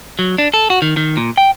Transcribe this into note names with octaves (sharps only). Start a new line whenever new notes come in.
F#3
D4
A4
F#4
D#3
D#3
A#2
G5